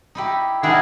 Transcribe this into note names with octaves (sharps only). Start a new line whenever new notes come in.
D#4 E4 G4
D#3 D4 E4 G#4 A#4 E5 F#5